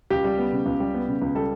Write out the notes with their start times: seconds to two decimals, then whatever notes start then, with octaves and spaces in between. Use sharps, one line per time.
0.10 C#2 G4
0.24 G3
0.38 B3
0.52 C#3
0.66 C#2
0.80 G3
0.94 B3
1.08 C#3
1.22 C#2
1.35 G3 A4